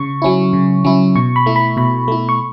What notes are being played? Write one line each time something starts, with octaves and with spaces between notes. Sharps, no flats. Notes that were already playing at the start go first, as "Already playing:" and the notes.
Already playing: C#3 C#6
F#3 C#4 E4
C#3
F#3 C#4 E4
B2 C#6
B5
A3 E4
B5
B2 B5
A3 E4
C#6